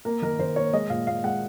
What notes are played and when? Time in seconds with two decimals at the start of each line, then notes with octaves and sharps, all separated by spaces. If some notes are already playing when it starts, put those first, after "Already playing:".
0.05 A#3 A#4
0.22 D#3 A#4
0.39 D#3 C5
0.56 A#3 C#5
0.73 G#3 D#5
0.90 A#2 F5
1.07 A#2 F5
1.24 G#3 F#5